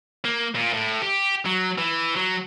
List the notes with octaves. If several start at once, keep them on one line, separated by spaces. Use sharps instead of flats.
A#3
A#2
A2
G4
F#3
E3
F#3